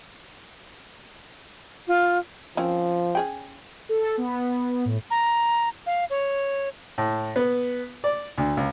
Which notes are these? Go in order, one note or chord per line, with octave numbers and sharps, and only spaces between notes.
F4
F3 C4 C#4 A#4
C#4 G#4 G5
A4
B3
A2
A#5
F5
C#5
A2
B3
D5
D2
C#2